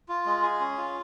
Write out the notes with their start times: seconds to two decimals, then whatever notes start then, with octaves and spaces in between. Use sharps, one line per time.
0.09 F4
0.26 G#3
0.43 G#4
0.61 C#4
0.78 F4